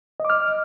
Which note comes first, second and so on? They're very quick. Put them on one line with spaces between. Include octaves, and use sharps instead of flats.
D#5 D6 F6